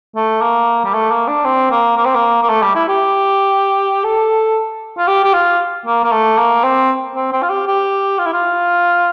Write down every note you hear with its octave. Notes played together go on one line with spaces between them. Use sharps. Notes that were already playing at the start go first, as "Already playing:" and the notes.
A3
A#3
G3
A3
A#3
D4
C4
A#3
A#3
C4
A#3
A#3
A3
G3
E4
G4
A4
F4
G4
G4
F4
A#3
A#3
A3
A#3
C4
C4
C4
F4
G4
G4
F4
E4
F4